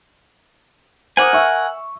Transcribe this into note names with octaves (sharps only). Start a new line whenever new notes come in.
A#4 C5 F#5 G#5 D6 D#6
E5 C#6 E6